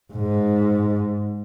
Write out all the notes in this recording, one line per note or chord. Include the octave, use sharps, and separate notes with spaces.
G#2